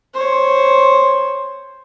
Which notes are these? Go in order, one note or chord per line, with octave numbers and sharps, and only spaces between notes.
C5 C#5